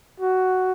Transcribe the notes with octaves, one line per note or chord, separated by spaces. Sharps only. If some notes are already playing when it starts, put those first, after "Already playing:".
F#4